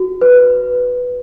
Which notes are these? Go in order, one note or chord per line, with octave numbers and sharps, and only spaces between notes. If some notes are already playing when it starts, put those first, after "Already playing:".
Already playing: F#4
B4